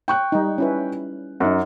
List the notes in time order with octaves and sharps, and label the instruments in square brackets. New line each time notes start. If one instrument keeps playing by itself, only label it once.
[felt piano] G5 C#6 F#6
[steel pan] G3 D#4
C#4 E4 B4
[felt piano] F#2 [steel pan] D#4 F#5